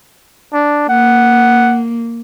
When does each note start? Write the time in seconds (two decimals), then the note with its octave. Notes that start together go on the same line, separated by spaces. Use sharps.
0.53 D4
0.89 A#3 F#5